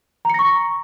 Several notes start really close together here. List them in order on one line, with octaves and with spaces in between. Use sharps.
A#5 C#7 A#6 C#6